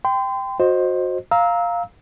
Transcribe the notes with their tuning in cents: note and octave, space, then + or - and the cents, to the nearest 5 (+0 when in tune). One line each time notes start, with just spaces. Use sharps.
G5 +0 C6 -35
F#4 -20 C5 +10 D#5 +0
F5 +0 A#5 +0 E6 -30